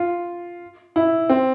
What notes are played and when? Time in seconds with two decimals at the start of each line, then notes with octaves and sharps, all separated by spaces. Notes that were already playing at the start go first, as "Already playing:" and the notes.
Already playing: F4
0.96 E4
1.29 C4